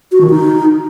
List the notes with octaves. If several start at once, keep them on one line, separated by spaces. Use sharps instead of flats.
F#4
D#3
D#4